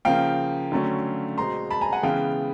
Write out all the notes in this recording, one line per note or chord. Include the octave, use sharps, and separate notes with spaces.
C#3 F3 A#3 F5 G5
D3 F#3 A3 C#4
B2 G#3 C4 A#5 C6
A5 B5
G#5 A#5
F#5 G#5
C#3 E3 G#3 B3 F5 G5